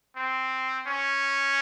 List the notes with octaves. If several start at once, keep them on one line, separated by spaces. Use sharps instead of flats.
C4
C#4